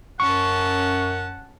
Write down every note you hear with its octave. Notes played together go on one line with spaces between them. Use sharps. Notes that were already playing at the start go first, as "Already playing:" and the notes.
F#2 C#4 F#5 A5 C#6